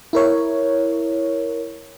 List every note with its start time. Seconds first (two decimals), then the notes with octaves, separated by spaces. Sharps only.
0.13 E4 A#4 C#5